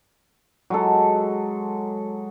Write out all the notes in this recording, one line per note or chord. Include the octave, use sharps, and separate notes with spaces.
F#3 G#3 A4